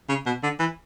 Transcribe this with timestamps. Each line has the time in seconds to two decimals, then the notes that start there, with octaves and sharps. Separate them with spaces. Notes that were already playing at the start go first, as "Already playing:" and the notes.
0.09 C#3
0.26 B2
0.43 D3
0.60 E3